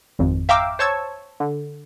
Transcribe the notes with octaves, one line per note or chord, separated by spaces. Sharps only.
G#1 F2
E5 F5 G5 A#5 D6 E6
C5 C#5 A5 C#6 E6 G#6
D3